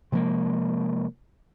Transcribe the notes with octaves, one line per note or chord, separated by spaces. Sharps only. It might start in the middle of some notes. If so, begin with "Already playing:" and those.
C3 F3 G#3 A#3